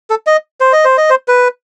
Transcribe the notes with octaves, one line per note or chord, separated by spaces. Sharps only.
A4
D#5
C5
D#5
C5
D#5
C5
B4